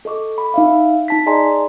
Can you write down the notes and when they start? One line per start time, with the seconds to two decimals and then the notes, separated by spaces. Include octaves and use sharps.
0.05 A4 D#5 C#6 D6
0.38 B5
0.54 D#4 E5 F5
1.08 D#4 A5 B6
1.26 G#4 D5 D#5 G#5 A#5 C6